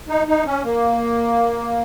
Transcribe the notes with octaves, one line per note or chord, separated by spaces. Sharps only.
D#4
D#4
C#4
A#3